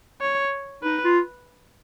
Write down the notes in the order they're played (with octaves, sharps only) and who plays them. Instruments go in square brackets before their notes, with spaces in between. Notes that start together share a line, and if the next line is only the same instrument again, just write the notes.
[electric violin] C#5
[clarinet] D#4 [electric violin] B4
[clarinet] F4